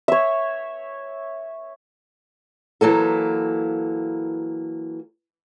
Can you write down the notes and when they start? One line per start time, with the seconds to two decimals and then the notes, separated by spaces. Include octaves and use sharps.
0.08 C#5 E5
2.81 E3 F#3 A#3 A4